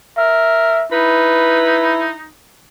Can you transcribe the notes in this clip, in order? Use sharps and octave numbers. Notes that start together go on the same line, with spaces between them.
A#4 E5
D#4 E4 B4